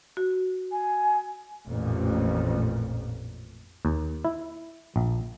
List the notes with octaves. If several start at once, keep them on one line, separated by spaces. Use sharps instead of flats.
F#4
G#5
A1 F2 A#2
D#2
E4
A#1